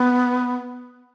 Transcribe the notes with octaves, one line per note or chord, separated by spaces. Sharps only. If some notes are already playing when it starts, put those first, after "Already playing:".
Already playing: B3